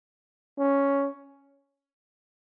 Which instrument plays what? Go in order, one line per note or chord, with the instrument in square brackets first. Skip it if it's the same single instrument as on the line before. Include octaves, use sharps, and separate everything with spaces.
[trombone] C#4